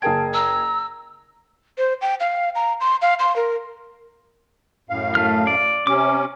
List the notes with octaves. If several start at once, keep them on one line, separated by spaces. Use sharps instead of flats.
F#1 G#4 A#4 G5 A5 G#6 D7
A#5 E6
C5
G5
F5
A#5
C6
F5
C6
A#4
F#2 A2 F5
A3 F6
D5
C3 C#4 D6